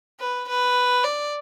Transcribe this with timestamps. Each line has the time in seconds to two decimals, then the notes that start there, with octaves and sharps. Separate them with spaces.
0.20 B4
0.48 B4
1.04 D5